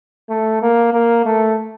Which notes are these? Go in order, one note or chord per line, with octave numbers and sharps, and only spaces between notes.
A3
A#3
A#3
A3